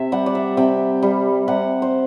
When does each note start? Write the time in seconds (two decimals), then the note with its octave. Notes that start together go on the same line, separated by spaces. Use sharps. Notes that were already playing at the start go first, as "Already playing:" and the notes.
Already playing: C3 E5
0.12 G3 F#5
0.26 D5
0.35 E5
0.57 C3 G5
1.03 G3
1.48 C3 F#5
1.82 C5